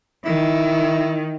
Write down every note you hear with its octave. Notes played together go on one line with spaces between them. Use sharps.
D#3 E4